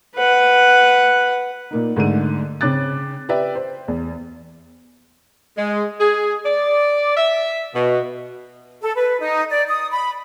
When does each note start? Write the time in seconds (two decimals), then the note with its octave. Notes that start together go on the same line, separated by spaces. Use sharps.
0.16 B4 F#5
1.71 A#2 A#3 D#4
1.96 G#2 D3 A3 D#7
2.61 C#3 C4 C#4 D6 F#6 A6
3.29 G4 B4 D5 E5
3.55 C5
3.88 E2
5.57 G#3
5.99 G#4
6.45 D5
7.16 E5
7.74 B2
8.82 A4
8.95 B4
9.20 D#4
9.49 D5
9.68 D#6
9.91 B5